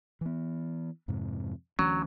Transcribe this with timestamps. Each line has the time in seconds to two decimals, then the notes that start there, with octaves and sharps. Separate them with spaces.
0.21 E3 B3
1.08 F2 G#2 C3
1.79 D2 E3 F#3 C#4